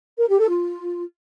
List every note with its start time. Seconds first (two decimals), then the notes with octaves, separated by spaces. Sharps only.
0.18 A#4
0.28 G4
0.38 A4
0.48 F4